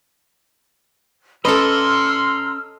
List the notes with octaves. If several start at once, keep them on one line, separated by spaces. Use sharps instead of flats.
C#4 A4 B4 D#5 A#5 C6 E6 F6